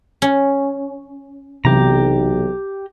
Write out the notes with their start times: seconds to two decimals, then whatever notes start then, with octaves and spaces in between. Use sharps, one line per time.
0.22 C#4
1.65 B1 C3 E3 G4 A#5